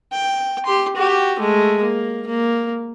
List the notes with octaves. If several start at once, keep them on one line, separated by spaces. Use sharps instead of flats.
G5
G4 C6
F#4 G4
G#3 A3
A#3
A#3